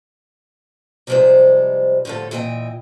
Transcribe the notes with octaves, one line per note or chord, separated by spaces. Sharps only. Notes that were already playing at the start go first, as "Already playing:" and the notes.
C3 F3 G3 G#3 D#4 C5
A2 D3 F3 B3 A4
A#2 E3 E4 D#5 G5